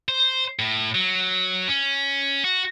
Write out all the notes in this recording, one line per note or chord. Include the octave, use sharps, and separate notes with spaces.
C5
A2
F#3
C#4
F#4